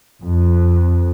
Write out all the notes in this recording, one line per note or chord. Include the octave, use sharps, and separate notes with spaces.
F2